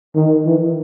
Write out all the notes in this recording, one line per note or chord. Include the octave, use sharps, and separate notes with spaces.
D#3
E3